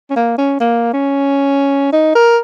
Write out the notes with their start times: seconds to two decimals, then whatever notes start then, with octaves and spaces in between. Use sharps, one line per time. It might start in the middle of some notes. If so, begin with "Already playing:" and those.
0.10 C#4
0.16 A#3
0.38 C#4
0.60 A#3
0.94 C#4
1.93 D#4
2.15 A#4